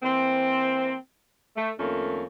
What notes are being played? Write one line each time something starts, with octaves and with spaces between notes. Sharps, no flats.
E3 A#3 C4
A3
F2 D#3 A3 A#3 C#4